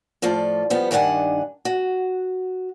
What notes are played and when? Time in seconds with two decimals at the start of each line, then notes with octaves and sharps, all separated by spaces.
0.22 A2 F3 F4 A4 D5
0.70 F3 G3 B3
0.91 G2 D#3 D4 F#5 G#5
1.65 F#4